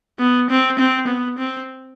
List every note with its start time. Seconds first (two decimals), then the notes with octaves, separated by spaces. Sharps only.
0.19 B3
0.50 C4
0.79 C4
1.08 B3
1.38 C4